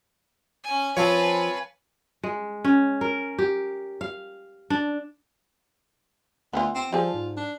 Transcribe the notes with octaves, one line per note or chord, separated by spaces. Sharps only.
C#4 G#5
F3 C4 B4 C#5 F5 G#5 A5
G#3
C#4
A#4
G4
F5
D4
D2 B3 F4
C4
F3 G3 F4 G#4 A4
G#2
D4